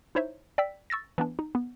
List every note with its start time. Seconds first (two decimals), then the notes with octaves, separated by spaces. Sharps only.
0.15 D#4 E4 C5 C#5 E5
0.58 D5 G5 E6 B6
0.90 C#6 E6 A6 A#6
1.18 E3 B3 D4
1.39 D#4
1.55 B3